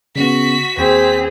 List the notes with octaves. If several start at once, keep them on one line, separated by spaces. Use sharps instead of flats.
C#3 B3 F#4 B6
D#2 C4 G#4 G5 B6